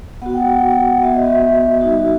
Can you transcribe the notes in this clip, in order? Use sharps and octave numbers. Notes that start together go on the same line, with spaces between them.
B3 F#4 F#5
G5
F#5
G5
F#5
B3 F#4 E5
D#5
E5
G3 D#4 F#4